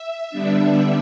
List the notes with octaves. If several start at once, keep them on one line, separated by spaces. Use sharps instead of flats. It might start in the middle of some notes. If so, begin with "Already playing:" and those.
Already playing: E5
D3 G3 B3 D4